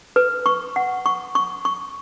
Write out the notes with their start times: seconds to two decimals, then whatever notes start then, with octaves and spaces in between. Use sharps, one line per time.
0.16 B4
0.46 C#6
0.76 F#5
1.06 C#6
1.35 C#6
1.65 C#6